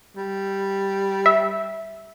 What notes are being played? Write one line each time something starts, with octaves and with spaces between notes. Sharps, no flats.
G3
E5